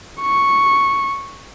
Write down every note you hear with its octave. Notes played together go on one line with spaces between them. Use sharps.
C#6